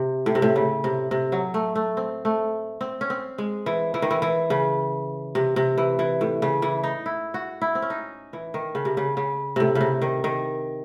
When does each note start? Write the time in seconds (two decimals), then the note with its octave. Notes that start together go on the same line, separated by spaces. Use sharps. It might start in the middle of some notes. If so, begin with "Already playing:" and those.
Already playing: C3
0.26 A2
0.35 C3
0.42 A2
0.56 C#3
0.84 C3
1.11 C3
1.32 F#3
1.54 A3
1.75 A3
1.97 C4
2.25 A3
2.81 C4
3.01 C#4
3.10 C4
3.38 G#3
3.66 E3
3.94 E3
4.02 D#3
4.11 E3
4.22 E3
4.50 C#3
5.35 C3
5.56 C3
5.78 E3
5.99 E3
6.21 A2
6.42 C#3
6.62 E3
6.84 D#4
7.06 E4
7.34 F#4
7.62 E4
7.75 C4
7.82 C#4
7.90 D#4
8.33 E3
8.54 D#3
8.75 C#3
8.85 C3
8.97 C#3
9.17 C#3
9.56 A2 C3
9.75 C#3
9.81 C3
10.02 D#3
10.24 D#3